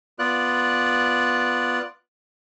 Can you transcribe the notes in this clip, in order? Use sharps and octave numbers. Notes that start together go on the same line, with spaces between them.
B3 F4 D5 F#6